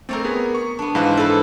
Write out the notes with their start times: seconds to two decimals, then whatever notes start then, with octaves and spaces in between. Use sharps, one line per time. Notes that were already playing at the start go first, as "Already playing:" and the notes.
0.09 A3 C4 A#4 C#5 D5
0.24 B3 G#4
0.55 C#6
0.79 B3 D4
0.95 G#2 E3 B4 C5 F5
1.17 A4 B4